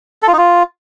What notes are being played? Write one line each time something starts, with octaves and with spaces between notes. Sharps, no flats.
A4
F4
D#4
F4